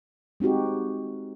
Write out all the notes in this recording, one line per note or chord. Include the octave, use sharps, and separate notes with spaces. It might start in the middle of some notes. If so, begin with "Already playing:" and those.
G#3 C4 D#4 F#4 G4